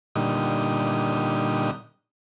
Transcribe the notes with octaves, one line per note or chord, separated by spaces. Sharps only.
A#2 D3 G3 D#4 D#6